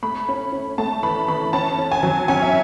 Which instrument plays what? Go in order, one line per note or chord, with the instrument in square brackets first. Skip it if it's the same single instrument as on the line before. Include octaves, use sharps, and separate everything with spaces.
[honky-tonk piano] A3 B5
C#4
C#4
A3 A5
E3 B5
E3 B5
C#4 A5
C#4
G#5
F#3
C#4 G#5
E5